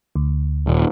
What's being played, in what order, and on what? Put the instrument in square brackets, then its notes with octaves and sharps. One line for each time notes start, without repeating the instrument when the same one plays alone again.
[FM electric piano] D2
[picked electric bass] D#1